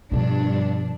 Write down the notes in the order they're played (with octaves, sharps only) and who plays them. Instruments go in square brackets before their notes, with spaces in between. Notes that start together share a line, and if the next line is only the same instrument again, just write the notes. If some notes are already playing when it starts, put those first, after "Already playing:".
[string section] G2 D4 [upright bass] B2 F3